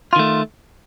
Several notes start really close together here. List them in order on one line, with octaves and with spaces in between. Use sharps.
F4 D#3 A3